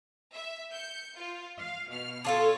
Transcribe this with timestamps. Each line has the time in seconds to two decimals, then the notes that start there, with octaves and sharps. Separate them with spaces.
0.34 E5
0.72 G6 C#7
1.16 F4
1.60 F5
1.90 B2 F6
2.25 D4 F4 A4 C#5